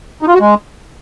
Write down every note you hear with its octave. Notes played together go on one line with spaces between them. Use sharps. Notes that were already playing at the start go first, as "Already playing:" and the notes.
D#4
F4
F#4
G#3